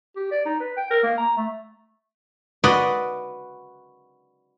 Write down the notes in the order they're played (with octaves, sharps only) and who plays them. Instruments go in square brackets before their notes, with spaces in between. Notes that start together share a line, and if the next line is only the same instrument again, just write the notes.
[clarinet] G4
D5
D#4
B4
G5
A#4
A#3
A#5
A3
[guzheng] F#4 B4 D5 D#5